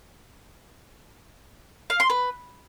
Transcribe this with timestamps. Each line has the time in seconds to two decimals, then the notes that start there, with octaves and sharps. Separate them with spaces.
1.90 F5
2.00 C6
2.10 B4